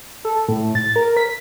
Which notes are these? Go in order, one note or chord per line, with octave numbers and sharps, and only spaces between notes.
A4
A2
A6
A#4
B6